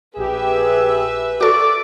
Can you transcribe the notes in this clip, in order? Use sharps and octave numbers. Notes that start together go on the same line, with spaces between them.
A#1 G4 G#4 B4 E5
F#4 A4 D5 C#6 D6